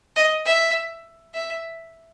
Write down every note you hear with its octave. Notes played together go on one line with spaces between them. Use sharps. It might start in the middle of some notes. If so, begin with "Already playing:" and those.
D#5
E5
E5